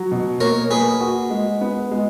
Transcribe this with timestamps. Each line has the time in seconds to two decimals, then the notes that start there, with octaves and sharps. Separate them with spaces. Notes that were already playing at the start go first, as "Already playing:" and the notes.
Already playing: F#3
0.12 B2
0.40 A#3 A#4 C#5
0.71 A#3 G#4 B4
1.00 F#4
1.30 G#3
1.61 B3
1.91 G#3